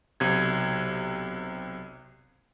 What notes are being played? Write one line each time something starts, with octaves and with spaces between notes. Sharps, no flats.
B1 C3 G#6